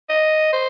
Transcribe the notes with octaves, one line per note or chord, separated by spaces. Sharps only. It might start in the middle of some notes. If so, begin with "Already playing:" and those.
D#5
C5